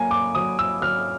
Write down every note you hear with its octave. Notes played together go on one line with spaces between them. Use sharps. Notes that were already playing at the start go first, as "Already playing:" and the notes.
Already playing: F#3 A#3 G#5
D6
F#3 D#6
E6
F#3 F6